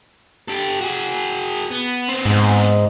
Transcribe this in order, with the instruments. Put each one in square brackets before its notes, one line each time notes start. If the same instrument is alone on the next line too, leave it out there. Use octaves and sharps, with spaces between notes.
[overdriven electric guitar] G4 A4
F#4 G#4
B3
B3 C4
[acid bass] G#2